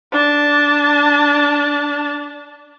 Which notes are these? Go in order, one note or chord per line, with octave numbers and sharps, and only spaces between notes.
D4 A5